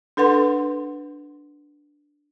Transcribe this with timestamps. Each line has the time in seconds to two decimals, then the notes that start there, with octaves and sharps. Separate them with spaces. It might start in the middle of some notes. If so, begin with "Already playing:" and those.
0.17 D4 A4 B4 F#5 C6